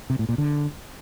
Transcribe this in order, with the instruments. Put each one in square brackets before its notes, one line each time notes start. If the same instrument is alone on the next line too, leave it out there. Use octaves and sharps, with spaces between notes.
[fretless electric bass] C3
A2
A#2
D3